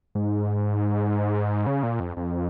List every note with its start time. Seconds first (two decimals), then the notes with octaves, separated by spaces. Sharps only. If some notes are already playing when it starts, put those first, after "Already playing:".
0.15 G#2
1.67 C#3
1.83 A#2
2.00 F2
2.17 F2